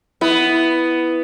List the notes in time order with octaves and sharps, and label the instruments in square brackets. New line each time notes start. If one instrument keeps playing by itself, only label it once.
[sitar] B3 [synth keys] E4